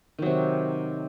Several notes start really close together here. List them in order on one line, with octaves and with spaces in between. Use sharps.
D#3 F#3 C3